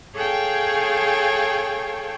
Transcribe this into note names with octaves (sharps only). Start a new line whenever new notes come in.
G#4 A4 C#5 F5 G5